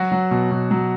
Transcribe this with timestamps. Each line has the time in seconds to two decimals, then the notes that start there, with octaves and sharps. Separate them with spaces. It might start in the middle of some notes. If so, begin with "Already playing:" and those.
Already playing: F#3 F#4
0.12 F#3
0.31 B2
0.51 B2
0.71 F#3